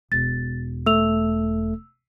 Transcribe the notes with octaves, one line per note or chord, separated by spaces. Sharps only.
E1 A6
A3 E6 F7